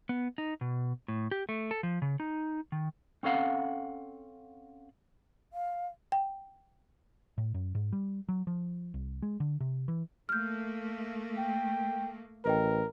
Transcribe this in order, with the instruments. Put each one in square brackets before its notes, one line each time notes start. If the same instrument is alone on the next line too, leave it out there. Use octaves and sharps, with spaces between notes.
[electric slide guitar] B3
D#4
B2
A2
G4
A3
A4
F3
C#3
D#4
D#3
[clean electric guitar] C4 C#4 A4 F5 F#5
[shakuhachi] F5
[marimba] G5
[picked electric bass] A2
F#2
G#2
G3
F#3
F3
C2
G#3
D3
C3
E3
[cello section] A3 A#3 [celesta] F6 G6
[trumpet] G5
[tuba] A1 [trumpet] A#4 [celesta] B4 D#5 G5